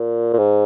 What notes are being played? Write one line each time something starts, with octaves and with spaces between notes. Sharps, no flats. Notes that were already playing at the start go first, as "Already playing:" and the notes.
Already playing: A#2
A#2
G#2